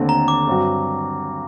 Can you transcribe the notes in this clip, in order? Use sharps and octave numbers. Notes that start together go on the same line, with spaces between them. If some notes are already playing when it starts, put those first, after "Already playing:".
Already playing: D#2 D3 A3 C4
A#5
D6
G2 F#3 C4 F#4